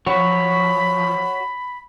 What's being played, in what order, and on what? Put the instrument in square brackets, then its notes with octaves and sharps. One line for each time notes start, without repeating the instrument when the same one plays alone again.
[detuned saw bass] F3 [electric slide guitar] F#4 C#5 [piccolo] B5